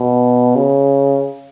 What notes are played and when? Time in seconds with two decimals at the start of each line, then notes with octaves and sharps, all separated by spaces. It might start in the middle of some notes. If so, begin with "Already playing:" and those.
Already playing: B2
0.55 C#3